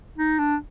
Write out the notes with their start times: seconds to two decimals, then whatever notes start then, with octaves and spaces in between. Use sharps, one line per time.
0.18 D#4
0.39 D4